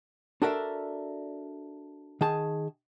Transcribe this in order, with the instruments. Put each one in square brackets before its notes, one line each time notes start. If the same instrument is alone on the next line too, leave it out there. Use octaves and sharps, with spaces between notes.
[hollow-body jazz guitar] D4 F#4 A4 A#4 D5 E5
D#3 G#4 A5